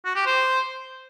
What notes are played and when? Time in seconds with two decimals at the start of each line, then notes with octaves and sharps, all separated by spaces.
0.05 F#4
0.16 G4
0.26 C5